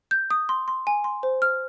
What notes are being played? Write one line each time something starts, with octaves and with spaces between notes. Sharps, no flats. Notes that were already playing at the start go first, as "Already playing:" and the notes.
G6
D#6
C6
C6
G#5
C6
C5
F6